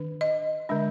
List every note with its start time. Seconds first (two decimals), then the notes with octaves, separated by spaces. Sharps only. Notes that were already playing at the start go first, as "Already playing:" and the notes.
Already playing: D#3 D4
0.21 D#5
0.69 D3 G#3 D4